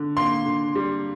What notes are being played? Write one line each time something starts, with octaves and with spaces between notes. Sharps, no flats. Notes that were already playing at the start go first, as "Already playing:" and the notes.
Already playing: D3
A#3 C6
D3
G3